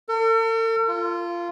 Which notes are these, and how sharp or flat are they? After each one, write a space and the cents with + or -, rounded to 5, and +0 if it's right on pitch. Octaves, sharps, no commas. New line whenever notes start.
A4 +45
F4 -15